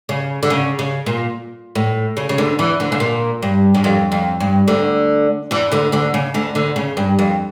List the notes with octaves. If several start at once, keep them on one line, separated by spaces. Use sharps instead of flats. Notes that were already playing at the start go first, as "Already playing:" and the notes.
C#3
D3
C#3
C#3
A#2
A2
C#3
C#3
D2 D3
E2 E3
D2 D3
C#3
A#2
G2
G2
F2
F2
G2
D2 D3
E2 E3
D2 D3
D2 D3
C#3
D2 D3
D2 D3
C#3
G2
F2